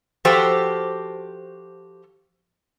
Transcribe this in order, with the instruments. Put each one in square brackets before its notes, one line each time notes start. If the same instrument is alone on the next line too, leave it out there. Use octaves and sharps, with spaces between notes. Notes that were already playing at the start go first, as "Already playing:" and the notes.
[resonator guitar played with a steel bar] F3 F#4 G4 A4 C5